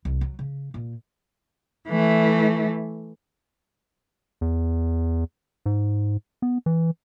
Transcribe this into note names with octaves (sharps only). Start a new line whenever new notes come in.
C2
F#3
C#3
A#2
E3 A3
E2
G#2
B3
E3